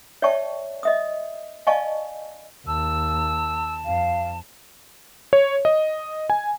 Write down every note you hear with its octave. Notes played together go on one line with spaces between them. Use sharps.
C#5 D5 E5 G5 A5 C#6
D#5 E5 D#6
D5 D#5 F5 G#5 A5 C#6
D#2 A5 E6
F2 F5
C#5
D#5
G#5